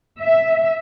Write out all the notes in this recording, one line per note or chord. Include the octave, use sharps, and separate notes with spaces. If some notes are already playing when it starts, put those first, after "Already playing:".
E5